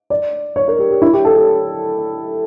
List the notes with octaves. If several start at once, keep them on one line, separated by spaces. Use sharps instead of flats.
D5
C#5
A#4
G4
G4
E4
G4
A4
G4